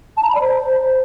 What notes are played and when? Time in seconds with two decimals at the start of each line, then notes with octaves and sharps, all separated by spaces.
0.17 A5
0.23 A#5
0.29 B5
0.35 D5
0.41 C5